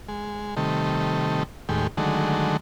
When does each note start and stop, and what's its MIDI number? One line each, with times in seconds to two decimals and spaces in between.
0.08 0.55 56
0.57 1.43 48
0.57 1.43 51
0.57 1.43 55
0.57 1.43 57
1.69 1.87 39
1.69 1.87 45
1.69 1.87 56
1.69 1.87 67
1.97 2.57 50
1.97 2.57 51
1.97 2.57 54
1.97 2.57 56
1.97 2.57 57